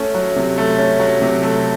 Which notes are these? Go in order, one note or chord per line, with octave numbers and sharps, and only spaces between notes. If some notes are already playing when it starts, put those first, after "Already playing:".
Already playing: A3 C#4
F#3
C3
A3
C#4
F#3
C3
A3